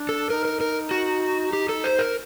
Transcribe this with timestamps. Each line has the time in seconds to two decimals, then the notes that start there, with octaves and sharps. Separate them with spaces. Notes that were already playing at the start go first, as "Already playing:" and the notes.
Already playing: D4
0.09 A4
0.30 D#4 A#4
0.45 A#4
0.61 A#4
0.91 F#4
1.53 G4
1.69 A4
1.84 C5
1.99 A#4